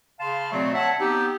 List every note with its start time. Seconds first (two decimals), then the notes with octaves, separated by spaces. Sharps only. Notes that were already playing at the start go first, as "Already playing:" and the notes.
0.20 C#3 F5 A5 C6
0.52 B2 F#3 A3 C4 D5
0.74 C#5 E5 F#5 A5
1.00 B3 C4 D#4 G4